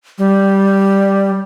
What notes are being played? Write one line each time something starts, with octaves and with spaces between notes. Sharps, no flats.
G3